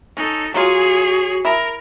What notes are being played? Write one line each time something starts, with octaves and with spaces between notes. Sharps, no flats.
C#4 D#4 A4
F#3 F4 F#4 G#4 C#5
E4 A#4 E5 A#5